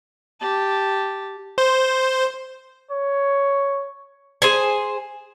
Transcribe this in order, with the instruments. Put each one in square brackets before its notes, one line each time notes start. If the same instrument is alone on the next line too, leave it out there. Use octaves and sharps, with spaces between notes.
[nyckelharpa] G4 A5
[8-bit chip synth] C5
[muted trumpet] C#5
[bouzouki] G#4 C5 G#5